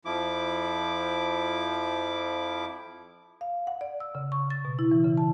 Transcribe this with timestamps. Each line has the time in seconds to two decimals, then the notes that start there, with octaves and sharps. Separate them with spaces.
0.05 F2 F3 E4 D6
3.41 F5
3.67 F#5
3.81 D5
4.00 E6
4.15 C#3
4.32 C#6
4.50 A6
4.65 B2
4.79 E4
4.91 E3
5.04 C#3
5.17 A5